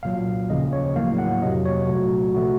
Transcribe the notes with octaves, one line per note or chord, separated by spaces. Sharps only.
C2 A#2 F#3 F5
D#2 C#3 F3 D#5
C#5
A1 A2 F#3 A#3 F5
F#5
F2 C3 F#3 D#5
C#5
C2 A#2 F#3 A3 F#4
C3 F3 A3 F#4